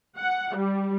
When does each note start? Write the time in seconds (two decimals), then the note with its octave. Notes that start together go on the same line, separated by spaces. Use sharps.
0.17 F#5
0.55 G3